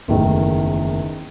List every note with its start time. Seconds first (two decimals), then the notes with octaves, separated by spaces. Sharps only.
0.08 F#1 E2 D#3 A3